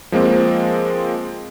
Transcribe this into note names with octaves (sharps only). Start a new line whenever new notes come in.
F3 G#3 A#3 C4